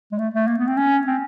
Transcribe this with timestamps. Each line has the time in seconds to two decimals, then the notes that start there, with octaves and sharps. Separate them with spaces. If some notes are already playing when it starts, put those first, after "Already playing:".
0.12 G#3
0.19 A3
0.34 A3
0.48 A#3
0.58 B3
0.67 C4
0.77 C#4
1.07 C4